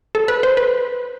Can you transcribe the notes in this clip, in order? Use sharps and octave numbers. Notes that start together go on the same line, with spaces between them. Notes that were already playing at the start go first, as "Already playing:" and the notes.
A4
B4
C5
B4